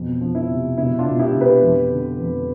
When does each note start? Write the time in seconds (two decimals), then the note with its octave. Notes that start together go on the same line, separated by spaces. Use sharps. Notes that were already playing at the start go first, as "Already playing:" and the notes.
Already playing: F2 B2
0.21 F3
0.35 E4
0.49 C3
0.77 B2 E4
0.99 D4 F4
1.06 B2
1.19 E4 G4
1.33 B2
1.41 G4 B4
1.62 F2
1.90 D3
2.18 F2